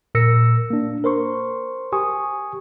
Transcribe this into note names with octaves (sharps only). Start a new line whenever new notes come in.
A#2 A#4 E6 A#6 C#7
A#3 D4
A#4 C5 C6 C#6
G4 G#5 C#6 D#6